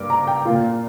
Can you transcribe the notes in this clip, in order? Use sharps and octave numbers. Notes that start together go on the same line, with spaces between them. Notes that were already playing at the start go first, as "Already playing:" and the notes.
Already playing: G2 A#3 D6
A#5
G5
A#2 A#3 F4